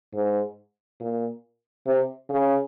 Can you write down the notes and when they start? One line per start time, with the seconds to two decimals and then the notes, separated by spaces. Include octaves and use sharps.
0.14 G#2
1.00 A#2
1.86 C3
2.29 C#3